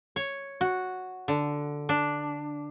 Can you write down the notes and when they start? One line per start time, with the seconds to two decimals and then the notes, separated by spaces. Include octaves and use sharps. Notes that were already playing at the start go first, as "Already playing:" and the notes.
0.16 C#5
0.61 F#4
1.28 D3
1.89 D4